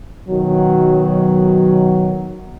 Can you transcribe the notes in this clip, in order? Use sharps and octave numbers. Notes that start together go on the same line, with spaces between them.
B2 D#3 F#3